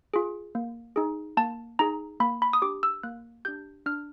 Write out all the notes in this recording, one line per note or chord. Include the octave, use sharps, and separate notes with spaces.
F4 G#4
A#3
D#4 G#4
A#3 A5
D#4 G#4 A#5
A#3 B5
B5
D#6
D4 G4 D6
E6
A#3 F#6
D4 G4 G6
D4 F6